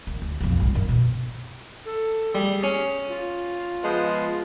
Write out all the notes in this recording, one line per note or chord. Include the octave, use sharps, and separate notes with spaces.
D#3
D2
B1 F2
G2
F#2 D#3
B2
A4
G3 G#4
C#4
F4
F3 G#3 B3